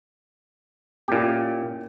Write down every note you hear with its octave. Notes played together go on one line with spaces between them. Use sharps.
A#2 A#3 C#4 E4 G4